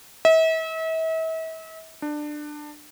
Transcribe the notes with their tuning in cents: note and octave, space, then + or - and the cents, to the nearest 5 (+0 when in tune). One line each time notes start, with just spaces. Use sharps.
E5 -40
D4 +20